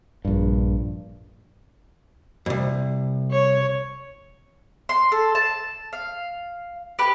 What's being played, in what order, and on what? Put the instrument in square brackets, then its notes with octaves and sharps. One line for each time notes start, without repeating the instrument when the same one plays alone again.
[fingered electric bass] A#1 G2
[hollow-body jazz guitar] C2 F2
[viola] C#5
[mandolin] C6
A4
A5
F5
G4 B4